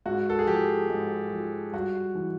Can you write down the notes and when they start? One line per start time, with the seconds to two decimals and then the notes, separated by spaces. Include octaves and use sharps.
0.06 G#2 F#4
0.30 A4
0.39 G#4
0.47 F3 G4
0.90 G#2
1.31 F3
1.73 G2 F#4
2.15 E3